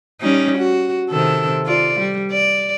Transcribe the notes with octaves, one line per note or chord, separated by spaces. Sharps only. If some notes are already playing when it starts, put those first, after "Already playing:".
G3 C#4 D#4
F#4
C3 D#3 A4
F4 D5
G3
D5